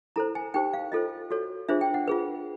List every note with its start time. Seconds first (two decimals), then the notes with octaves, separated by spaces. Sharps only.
0.16 E4 A4 C5 A#5
0.35 G#5
0.54 D#4 G4 C5 G5
0.73 F5
0.92 F4 A4 C5 D#5
1.31 F#4 A4 C#5
1.69 D4 F4 G#4 C5 E5
1.81 G5
1.94 F#5
2.08 F4 G#4 B4